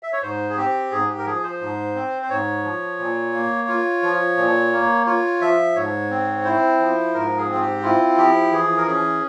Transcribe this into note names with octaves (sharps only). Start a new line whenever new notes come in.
E5
C#5
G#2 C5
G#4
C4 G4
G#2 G#4
G4
A#4
F3 G#4
C5
G#2
C4
C5
G#2 C#5
F3
A#2
A#3
F4
F3
A#2
A#3
F4 C#5
F3 E5
G#2 C#5
C4
E4 C5
F3
G#2 A#4
G#4
C4
F4
G4
E4 F4
F3 G4
E3 G#4
A#4
C#4 G#4